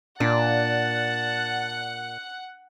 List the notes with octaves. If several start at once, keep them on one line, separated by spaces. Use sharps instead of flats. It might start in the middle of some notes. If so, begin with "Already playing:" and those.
A#2 D4 F#5 A5